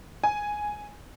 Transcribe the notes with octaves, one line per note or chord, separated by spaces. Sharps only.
G#5